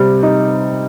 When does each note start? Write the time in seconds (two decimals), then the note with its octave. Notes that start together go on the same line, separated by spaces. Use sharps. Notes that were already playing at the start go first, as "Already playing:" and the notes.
Already playing: C3 G3 C4
0.23 D#4